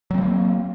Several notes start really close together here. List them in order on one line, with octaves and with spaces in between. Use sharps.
F#3 C4 A3 A#3